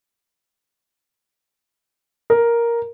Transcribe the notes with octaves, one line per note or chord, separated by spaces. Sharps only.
A#4